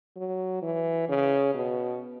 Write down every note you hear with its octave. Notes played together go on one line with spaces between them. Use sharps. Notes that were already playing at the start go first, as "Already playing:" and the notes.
F#3
E3
C#3
B2